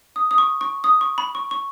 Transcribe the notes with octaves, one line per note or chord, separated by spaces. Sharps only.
D#6
D#6
C#6
C#6
D#6
C#6
B5
C#6
C#6